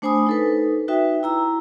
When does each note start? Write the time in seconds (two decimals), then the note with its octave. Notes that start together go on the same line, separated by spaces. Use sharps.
0.02 A3 D4 C5 G#5 B5 D#6
0.27 D#4 A4 B4
0.88 D#4 F#4 B4 E5 G5
1.23 E4 A#5 E6